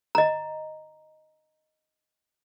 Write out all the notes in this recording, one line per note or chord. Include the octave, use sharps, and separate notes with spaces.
D#5 A#5